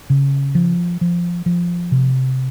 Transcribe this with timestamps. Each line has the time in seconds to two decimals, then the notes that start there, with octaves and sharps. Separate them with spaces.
0.10 C#3
0.55 F3
1.01 F3
1.46 F3
1.92 C3